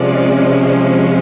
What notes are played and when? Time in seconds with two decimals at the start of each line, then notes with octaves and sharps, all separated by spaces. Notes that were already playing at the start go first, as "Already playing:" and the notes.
Already playing: C3 F3 G#3 C#4 D5